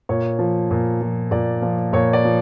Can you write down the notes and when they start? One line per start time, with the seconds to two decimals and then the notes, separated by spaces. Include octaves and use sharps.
0.09 A#2 C#5
0.39 F3
0.71 A#2
1.01 F3
1.31 A#2 D5
1.62 F3
1.93 A#2 C#5
2.13 D5
2.25 F3